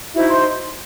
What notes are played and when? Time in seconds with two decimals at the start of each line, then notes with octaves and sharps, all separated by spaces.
0.15 D#4 E4 F#4 C5 E5
0.29 C5 C6